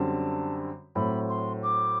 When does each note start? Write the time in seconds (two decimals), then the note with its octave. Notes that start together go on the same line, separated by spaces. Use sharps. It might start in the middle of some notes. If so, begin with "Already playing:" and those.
Already playing: F#2 D3 G3 C4 A5
0.95 A2 F#3 C4 B5
1.29 C6
1.62 D6